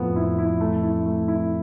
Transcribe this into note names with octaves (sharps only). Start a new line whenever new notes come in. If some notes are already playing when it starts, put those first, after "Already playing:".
Already playing: F2 A2 F3 B3
E4
E4
A3
E4
A3
E4